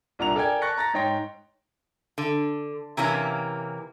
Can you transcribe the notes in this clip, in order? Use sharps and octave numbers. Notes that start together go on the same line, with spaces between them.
C2 A#2 D4 F#5 A#5 F7
A4 A#4 D5 G5 G#5 G#6
A5 C#6 F#6 A6 A#6 C#7
A#5 A6 A#6
G#2 D#4 C#5 G5 C6 A#6
D3
C3 E3 A#3 C#4